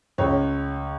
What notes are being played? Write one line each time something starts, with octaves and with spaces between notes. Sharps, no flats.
C#2 C#5